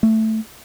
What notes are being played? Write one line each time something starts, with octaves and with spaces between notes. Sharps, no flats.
A3